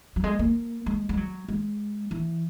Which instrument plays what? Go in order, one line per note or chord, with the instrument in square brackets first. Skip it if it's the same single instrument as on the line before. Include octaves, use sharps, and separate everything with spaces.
[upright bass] F#3
G#3
A#3
G#3
G#3
F#3
G#3
E3